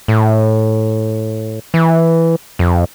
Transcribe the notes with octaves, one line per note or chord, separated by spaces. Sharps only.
A2
E3
F2